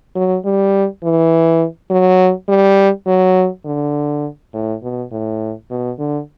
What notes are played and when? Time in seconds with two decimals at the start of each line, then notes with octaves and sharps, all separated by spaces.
0.16 F#3
0.45 G3
1.03 E3
1.90 F#3
2.48 G3
3.07 F#3
3.65 D3
4.54 A2
4.83 B2
5.11 A2
5.70 B2
5.99 D3